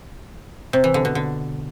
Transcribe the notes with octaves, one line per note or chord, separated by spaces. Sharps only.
C3
E3
D3
B2
D3